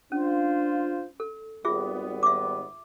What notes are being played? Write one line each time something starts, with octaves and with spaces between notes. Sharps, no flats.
C#4 D4 F4 C5
A4
G#1 G3 B3 F4 G#4 E5
E5 D6